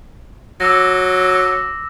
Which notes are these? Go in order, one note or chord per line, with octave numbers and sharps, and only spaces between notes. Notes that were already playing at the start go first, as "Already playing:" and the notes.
F#3 D6 E6 A#6